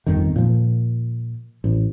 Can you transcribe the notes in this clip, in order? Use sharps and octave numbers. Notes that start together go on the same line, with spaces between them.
G1 F2 D#3
A#2 F3
A1